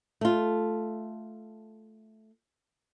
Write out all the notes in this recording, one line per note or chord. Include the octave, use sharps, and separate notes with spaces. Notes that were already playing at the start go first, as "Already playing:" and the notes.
A3 F4